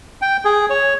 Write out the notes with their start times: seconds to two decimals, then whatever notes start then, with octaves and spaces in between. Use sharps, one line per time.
0.22 G5
0.45 G#4
0.70 C#5